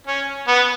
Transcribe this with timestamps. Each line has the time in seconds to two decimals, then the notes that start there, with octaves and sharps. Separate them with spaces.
0.07 C#4
0.47 B3